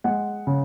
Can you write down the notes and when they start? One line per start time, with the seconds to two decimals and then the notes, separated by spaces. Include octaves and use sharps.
0.04 G#3 F#5
0.47 C#3